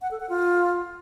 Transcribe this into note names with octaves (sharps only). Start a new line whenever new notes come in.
F#5
A4
F#5
F4